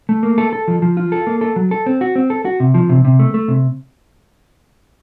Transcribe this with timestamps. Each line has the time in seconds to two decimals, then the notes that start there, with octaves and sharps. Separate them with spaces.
0.09 A3
0.23 A#3
0.38 A4
0.53 A4
0.68 F3
0.82 F3
0.97 F4
1.12 A4
1.27 A#3
1.41 A4
1.56 F#3
1.71 A4
1.86 C4
2.01 F#4
2.16 C4
2.30 A4
2.45 F#4
2.60 C3
2.74 F3
2.89 C3
3.05 C3
3.19 A3
3.34 A3
3.48 C3